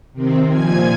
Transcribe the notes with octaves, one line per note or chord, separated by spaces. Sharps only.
C3 D#3 C4
A#2 F3 G#5 G#6